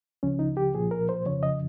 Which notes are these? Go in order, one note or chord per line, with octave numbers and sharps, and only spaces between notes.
C#2 C#3 F3 C#4
D#4
G4
C2 A#2 F3 G#4
A#4
C5
F2 C#3 F3 C#5
D#5